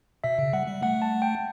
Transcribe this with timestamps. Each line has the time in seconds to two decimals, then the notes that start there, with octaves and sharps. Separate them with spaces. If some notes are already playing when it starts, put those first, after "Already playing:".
0.24 B2 E5
0.39 C#3
0.53 G3 F#5
0.68 G3
0.82 A3 F#5
1.02 A5
1.22 G5